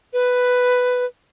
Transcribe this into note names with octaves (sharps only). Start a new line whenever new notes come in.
B4